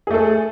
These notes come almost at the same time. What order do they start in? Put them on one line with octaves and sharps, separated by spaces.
G#4 A3 A4